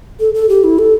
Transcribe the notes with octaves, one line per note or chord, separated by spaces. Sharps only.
A4
A4
G4
E4
A4